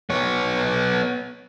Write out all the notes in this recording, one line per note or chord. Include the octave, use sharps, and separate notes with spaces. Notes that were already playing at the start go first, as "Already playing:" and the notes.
B3 C#5